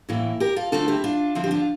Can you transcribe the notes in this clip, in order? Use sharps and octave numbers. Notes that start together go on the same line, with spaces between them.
A2 E3 A#3 E4
G4 A#4
F4 A4
D3 A3 C4 F4 A4
E4 G4
D4 F4
D3 F3 C4 E4
G4
D4 F4